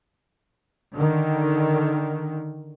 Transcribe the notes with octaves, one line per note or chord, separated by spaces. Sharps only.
D3 D#3